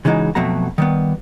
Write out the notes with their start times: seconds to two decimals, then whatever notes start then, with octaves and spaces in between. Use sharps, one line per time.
0.05 C#3 E3 G3 G#3 D#4 F#4
0.35 F2 B2 F#3 A3 A#5
0.78 D#3 G3 B3